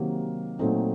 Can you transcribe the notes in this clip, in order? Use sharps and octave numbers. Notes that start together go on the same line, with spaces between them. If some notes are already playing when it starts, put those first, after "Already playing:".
Already playing: C3 D#3 F#3 A#3
A#2 F#3 A3 C4 D#4